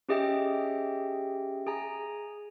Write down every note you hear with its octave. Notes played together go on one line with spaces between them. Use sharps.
C#4 G4 G#4 D#5 E5 G5
G#4 G#5 A#5